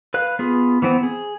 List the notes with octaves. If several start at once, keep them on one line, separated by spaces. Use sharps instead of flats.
B4 F5 F#6
B3 F4 G#4
E3 B3 C4
G#4